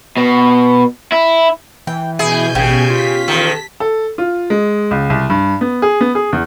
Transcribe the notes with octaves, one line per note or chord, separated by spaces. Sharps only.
B2
E4
E3 G5
B2 E4 G#4 G#5 G6
A1 C#3 G4
F4 B6
E2 D#3 A4
A4
F4
G#3
C#2
C2
G2
B3
G#4
B3
G#4
E2